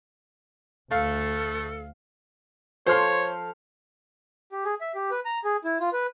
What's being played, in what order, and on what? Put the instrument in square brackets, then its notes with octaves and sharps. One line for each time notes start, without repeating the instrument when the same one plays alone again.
[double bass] D2 [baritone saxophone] A3 [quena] A4 [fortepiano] F5
[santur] F3 A4 F5 [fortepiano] C5 C6 [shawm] C#5
[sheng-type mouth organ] G4
G#4
E5
G4
B4
A#5
G#4
E4
F4
B4